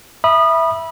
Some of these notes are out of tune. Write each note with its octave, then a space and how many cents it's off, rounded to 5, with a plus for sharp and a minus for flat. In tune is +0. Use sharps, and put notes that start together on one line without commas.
E5 +0 B5 -20 D#6 -25